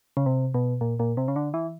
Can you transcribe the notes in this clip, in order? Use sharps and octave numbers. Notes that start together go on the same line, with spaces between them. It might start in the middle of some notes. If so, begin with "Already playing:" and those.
C#3
C3
B2
A#2
A#2
C3
C#3
D3
E3